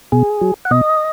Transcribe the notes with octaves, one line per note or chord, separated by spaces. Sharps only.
B2 G#4
F#3
F#5
B2 D#5